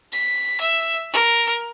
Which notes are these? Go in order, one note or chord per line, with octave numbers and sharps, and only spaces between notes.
B6
E5
A#4